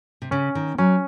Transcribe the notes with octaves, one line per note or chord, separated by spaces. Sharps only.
C3
C#3 C#4
D#3
F#3 C#4